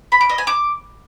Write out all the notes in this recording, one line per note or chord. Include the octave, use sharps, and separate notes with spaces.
B5
D6
D#5
G#5
D6